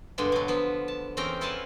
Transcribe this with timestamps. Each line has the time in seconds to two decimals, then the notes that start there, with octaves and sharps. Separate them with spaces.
0.18 G2 B2 D3 G#3
0.32 B2 F#3
0.48 F3 B3
0.88 A5
1.17 E2 C4 C#4 A#4 G5 A#5
1.41 E4 F4 F#5 G#5 A5